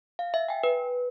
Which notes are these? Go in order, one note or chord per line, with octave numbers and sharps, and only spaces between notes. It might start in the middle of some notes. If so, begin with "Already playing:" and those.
F5
E5
G5 G#5
B4